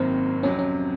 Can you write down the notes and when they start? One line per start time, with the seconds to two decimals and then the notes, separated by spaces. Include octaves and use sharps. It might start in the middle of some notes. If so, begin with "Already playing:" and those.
Already playing: G#1 F#2 D#3 F#3 A#3 C4
0.43 F2 C3 F#3 C#4
0.59 C#4